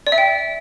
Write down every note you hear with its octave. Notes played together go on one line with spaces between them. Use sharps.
D5
E5
G5